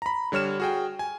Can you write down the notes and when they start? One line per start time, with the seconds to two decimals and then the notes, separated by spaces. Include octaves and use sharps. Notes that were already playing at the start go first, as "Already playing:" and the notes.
0.02 A#5 B5
0.32 D3 G3 C#5 F6 E7
0.60 F#4 G#4 G5
0.99 G#5